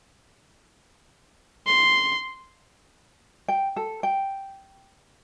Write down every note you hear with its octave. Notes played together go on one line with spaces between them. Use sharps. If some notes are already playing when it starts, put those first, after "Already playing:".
C6
G5
A4
G5